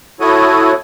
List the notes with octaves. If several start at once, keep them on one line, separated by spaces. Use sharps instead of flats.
E4 F#4 A4 C#5 D#6